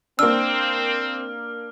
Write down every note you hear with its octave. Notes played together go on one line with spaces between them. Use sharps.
A#3 C4 D4 E6 F6